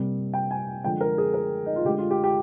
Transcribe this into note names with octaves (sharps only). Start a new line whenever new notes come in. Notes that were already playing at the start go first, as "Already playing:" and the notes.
Already playing: C3 G3 A#3
G5
G#5
D3 F3 G#3 G5
A#4
G#4
A#4
D#4
F4
D3 G#3 G4
F4
G4
G4